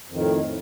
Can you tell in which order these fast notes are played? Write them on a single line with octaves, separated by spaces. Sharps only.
F2 D#3 A2